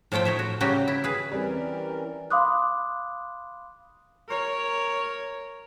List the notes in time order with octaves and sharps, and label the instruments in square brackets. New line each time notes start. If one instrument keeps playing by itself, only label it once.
[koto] A2 F3 A3 A4 G5
D#4 C#5 E5
F#4
C#3 F#3 G3 F#4 G4 G5
E4
G#4 B4
[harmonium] E3 C#4 A#4 [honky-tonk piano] G3 C4 [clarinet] D5
[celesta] F5 B5 C6 D6 D#6 F#6
[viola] A#4 C#5